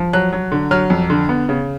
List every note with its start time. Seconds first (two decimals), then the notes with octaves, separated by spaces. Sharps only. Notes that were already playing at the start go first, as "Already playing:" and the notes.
Already playing: F3
0.13 F#3 F#6
0.33 F#3
0.52 D3
0.71 F#3 F6
0.90 F2
1.10 D3
1.29 B3
1.49 C#3